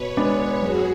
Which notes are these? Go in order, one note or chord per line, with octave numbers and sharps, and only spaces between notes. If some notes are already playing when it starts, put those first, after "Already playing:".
Already playing: B2 B4 C#5
G#3 B3 D4
F#2 F#4 G#4